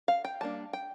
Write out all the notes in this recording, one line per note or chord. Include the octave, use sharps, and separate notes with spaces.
F5
G5
G3 A#3 D4 A5
G5